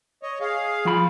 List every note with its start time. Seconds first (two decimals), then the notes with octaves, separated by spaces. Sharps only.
0.23 C#5 D#5
0.41 G#4 F5
0.85 F3 F4 B5